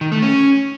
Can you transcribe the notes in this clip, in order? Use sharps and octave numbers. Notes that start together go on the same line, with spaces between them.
D#3
A3
C#4